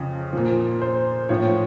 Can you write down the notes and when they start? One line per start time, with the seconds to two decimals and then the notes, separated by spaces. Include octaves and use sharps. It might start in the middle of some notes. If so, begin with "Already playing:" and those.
Already playing: F2 C#3 F3
0.33 A#2 F3
0.81 C5
1.29 A2 F3 C#5